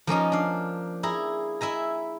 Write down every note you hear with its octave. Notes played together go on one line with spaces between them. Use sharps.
F3 A#3 C#4 D#4
D4 F5
E4 G#4 A#5
E4 E5 G#5 A#5